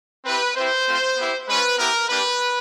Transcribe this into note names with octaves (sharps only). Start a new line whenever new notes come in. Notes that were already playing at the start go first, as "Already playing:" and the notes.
C4 E4 G4 B4
C4 E4 G4 C5
A3 C4 F4
B3 E4 G4
G#3 C#4 F4 B4
B3 E4 G4 A#4
A#3 D4 G4 B4